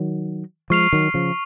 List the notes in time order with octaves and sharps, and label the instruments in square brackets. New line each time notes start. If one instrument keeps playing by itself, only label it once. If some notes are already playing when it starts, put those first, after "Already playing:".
Already playing: [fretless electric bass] D#3 F#3
[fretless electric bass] F3 G#3 [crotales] C#6 F6 C7 F7
[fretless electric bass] D#3 F#3
C#3 F3